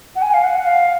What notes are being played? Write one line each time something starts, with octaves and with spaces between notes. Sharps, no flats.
F#5
G#5
F5
F#5
F5